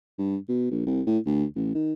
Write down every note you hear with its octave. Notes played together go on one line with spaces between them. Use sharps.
G2
B2
A#1
C2
A2
D2
A1
D#3